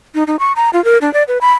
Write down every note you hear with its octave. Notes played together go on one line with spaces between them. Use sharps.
D#4
D#4
C#6
A#5
F4
A#4
D4
D5
B4
B5